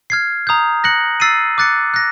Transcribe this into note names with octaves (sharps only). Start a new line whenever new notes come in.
F6 G#6 C7
A#5 D#6 G6
F#6 A#6 C#7 F#7
E6 A6 C7 D#7
D6 F#6 A6 C#7
F#6 A#6